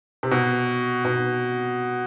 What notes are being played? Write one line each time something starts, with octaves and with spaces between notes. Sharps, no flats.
C3
B2
B2